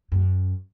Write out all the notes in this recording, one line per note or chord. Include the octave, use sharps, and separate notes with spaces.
F#2